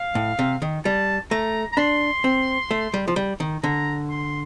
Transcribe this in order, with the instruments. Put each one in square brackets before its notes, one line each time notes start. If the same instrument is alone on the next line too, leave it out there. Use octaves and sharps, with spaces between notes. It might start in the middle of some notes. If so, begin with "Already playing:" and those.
Already playing: [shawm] F5
[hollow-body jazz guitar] A2
C3
D#3
[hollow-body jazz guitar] G3 [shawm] A5
[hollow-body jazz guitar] A3 [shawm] A#5
[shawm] A#5
[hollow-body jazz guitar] D4 [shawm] C6
[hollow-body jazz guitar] C4
A3
G3
F3
G3
D#3
[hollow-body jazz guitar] D3 [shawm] A#5
[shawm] C6